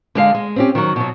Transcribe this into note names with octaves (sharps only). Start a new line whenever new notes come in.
D3 G#3 F5
G#3
C4 C#4 G4
D#3 F#3
B2 F#3